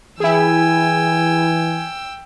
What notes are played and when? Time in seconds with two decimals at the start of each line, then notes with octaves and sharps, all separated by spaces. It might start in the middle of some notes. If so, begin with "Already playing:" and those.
0.20 E3 E4 G#4 G5 G#5 E6